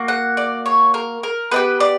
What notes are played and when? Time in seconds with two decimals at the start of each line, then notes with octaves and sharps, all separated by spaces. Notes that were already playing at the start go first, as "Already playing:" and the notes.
Already playing: A#3 F#4
0.08 F#5
0.37 D5
0.66 C#5
0.94 A#4
1.23 A#4
1.52 B3 D4 G4 B4
1.80 D5